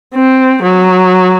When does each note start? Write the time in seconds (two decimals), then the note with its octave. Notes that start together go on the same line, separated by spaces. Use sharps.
0.15 C4
0.63 F#3